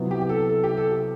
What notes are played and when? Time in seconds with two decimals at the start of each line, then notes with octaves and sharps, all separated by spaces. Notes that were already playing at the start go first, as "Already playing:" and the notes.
Already playing: C3 F#3 B3 E4
0.11 G4
0.21 G4
0.29 A4
0.49 A4
0.64 G4
0.77 A4
0.92 G4